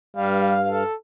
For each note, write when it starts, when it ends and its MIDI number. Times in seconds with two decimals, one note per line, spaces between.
0.17 0.83 43
0.17 0.57 55
0.17 0.83 77
0.70 0.95 69